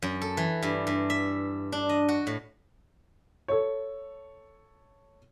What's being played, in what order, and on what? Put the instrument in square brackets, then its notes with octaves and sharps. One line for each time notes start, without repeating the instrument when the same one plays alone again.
[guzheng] F#2
A4
E3
G2
G2
E5
D4
D#5
F#4
A2
[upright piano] A4 C#5